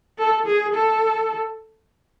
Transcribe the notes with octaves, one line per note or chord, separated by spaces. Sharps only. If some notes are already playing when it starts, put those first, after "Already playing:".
A4
G#4
A4